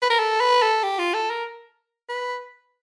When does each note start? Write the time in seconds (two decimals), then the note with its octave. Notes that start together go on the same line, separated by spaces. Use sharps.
0.02 B4
0.10 A#4
0.19 A4
0.40 B4
0.62 A4
0.83 G4
0.99 F4
1.14 A4
1.30 A#4
2.09 B4